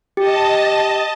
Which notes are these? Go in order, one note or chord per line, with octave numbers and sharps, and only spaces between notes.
G4 D#5 A5